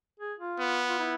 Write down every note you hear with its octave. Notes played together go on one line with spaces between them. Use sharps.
G#4
F4
B3
F4
E4